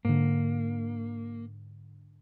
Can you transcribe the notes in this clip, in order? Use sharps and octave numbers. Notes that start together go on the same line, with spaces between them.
G#2 D3 A#3